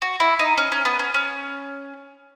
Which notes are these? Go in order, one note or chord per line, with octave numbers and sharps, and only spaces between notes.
F#4
E4
D#4
C#4
C#4
B3
C#4
C#4